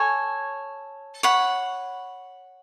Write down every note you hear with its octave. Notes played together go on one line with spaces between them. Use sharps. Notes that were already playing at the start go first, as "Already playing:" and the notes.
Already playing: A4 C#5 G#5
C#5 F#5 B5